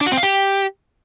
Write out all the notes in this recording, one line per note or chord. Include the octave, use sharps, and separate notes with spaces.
D4
F#4
C4
F5
G4